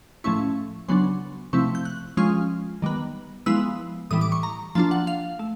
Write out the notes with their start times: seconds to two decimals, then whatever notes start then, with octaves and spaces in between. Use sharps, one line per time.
0.24 A2 F3 A3 C#4 E4 C#6
0.88 C#3 F#3 B3 D4 C6
1.53 C3 F3 A3 C4 E4 C#6
1.75 G6
1.85 F#6
2.17 F3 G#3 C#4 F4 F6
2.82 D#3 G3 B3
3.46 F3 G#3 B3 E4 E6
4.11 A2 E3 G3 D#6
4.21 D6
4.32 C#6
4.43 A#5
4.75 F3 A#3 D4 F4 A5
4.91 F#5
5.07 F5
5.39 A3